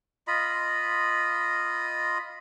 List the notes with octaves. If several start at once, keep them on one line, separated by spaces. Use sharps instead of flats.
F4 D#5 B5